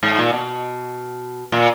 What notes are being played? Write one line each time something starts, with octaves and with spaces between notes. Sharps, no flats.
G#2
A#2
B2
A#2